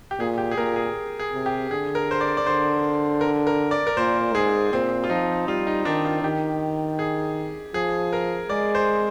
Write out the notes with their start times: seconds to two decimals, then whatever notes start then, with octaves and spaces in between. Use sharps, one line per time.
0.11 G4
0.19 A#2 G#4
0.38 G4
0.51 G#4
0.57 A#2 A#4
0.76 G#4
1.19 G#4
1.33 C3
1.46 G4
1.71 D3 G#4
1.95 A#4
2.11 C5
2.21 D5
2.37 D5
2.46 D3 C5
3.21 A#4
3.47 A#4
3.71 D5
3.87 A#4
3.97 A#2 C5
4.35 G#2 G#4
4.73 A#2 C4
5.04 F4
5.10 F3 D#4
5.48 G3 F4
5.67 D#4
5.85 D#3 D4
6.05 F4
6.23 D#3 G4
6.99 G#4
7.74 F3 G#4
8.13 A#4
8.50 G#3 D5
8.75 C5